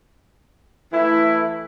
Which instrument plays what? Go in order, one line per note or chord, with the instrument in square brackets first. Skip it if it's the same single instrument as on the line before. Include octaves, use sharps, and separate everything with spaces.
[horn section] E3 A3 E4